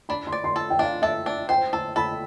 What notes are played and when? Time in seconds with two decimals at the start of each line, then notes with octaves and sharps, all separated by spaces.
0.09 D4 B5
0.27 C6
0.32 D5
0.44 C6
0.56 A4
0.70 G5
0.79 D4 F5
1.02 A4 E5
1.26 D4
1.49 C5 G5
1.73 A4 A5
1.96 A4 B5